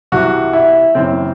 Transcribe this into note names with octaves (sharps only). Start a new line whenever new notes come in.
C2 C3 E3 F#4
E4
F#1 F#2 E3 C4